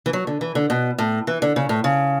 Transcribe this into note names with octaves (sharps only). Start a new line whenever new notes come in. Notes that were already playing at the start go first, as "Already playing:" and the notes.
E3
F#3
D3
E3
D3
B2
A2
E3
D3
C#3
A2
C#3